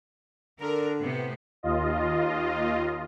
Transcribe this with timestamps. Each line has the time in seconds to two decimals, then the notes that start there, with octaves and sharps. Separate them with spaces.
0.60 D3 D4 A#4
1.01 A2 C3 B3
1.63 D#2 F4 D#5